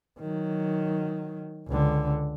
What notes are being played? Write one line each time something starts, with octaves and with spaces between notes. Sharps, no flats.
D#3 F#3
C#2 D3